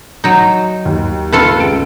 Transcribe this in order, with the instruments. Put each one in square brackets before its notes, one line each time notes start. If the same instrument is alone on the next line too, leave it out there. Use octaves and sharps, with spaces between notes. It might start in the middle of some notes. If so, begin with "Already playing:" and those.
[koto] F#3 D#4
[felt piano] D#2
[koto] F4 A4 B4
[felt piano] C#2 D7